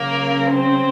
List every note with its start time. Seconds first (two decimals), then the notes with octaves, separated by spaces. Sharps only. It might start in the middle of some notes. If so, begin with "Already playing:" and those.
Already playing: C#3 F#3 A#3 C#4 A#4
0.51 C4 C5